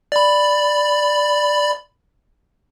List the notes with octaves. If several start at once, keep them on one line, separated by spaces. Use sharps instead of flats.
D5 B5